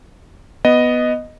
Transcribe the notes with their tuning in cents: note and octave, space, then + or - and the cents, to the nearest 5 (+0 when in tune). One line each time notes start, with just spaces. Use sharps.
B3 +0 D#5 +0